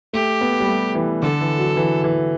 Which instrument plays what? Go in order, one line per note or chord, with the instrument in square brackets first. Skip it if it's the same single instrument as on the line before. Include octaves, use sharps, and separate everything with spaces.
[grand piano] A3 [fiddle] G4
[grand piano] B3
G3
A3
E3
[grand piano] D3 [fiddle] A4
[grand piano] E3
F#3
E3
E3